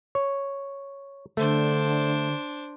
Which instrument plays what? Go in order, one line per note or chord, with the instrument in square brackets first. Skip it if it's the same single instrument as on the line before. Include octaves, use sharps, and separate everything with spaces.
[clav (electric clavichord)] C#5
[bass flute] D3 [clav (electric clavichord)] A3 [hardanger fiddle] D4 C5